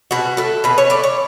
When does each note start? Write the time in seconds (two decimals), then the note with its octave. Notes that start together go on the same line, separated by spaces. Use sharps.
0.11 B2 F#4
0.37 A3 A4
0.64 B2 B4
0.78 C#5
0.90 A3 D5
1.04 C#5